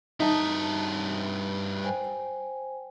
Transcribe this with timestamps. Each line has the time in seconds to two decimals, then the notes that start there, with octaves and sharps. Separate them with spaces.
0.20 G2 D#4 E5 A5
1.84 C5 G5 G#5